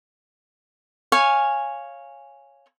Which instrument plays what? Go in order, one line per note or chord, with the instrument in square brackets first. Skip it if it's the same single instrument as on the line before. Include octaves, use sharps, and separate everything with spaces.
[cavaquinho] C#5 F5 G#5